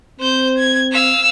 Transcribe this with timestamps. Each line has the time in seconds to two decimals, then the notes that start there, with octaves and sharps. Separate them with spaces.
0.20 C4 C5 G6
0.58 G#6
0.92 F5 E6